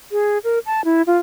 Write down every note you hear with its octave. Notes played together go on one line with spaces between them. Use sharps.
G#4
A#4
A5
E4
F4